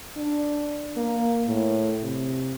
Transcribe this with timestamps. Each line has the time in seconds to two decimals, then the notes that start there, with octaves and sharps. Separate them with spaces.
0.17 D4
0.97 A#3
1.48 A2
2.03 C3